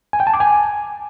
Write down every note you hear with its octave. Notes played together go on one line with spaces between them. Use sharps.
G#5
G5
A5
D6
G#5